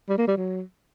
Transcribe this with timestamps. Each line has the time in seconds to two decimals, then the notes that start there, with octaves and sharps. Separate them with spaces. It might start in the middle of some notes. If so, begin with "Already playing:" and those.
0.08 G3
0.18 A#3
0.27 G3
0.37 F#3